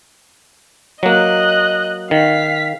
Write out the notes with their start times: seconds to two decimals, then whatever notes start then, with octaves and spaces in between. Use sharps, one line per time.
1.03 F#3 A#3 D#5 F#6
2.11 D#3 F5 B6